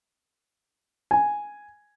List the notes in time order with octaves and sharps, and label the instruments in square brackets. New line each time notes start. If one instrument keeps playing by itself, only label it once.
[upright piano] G#5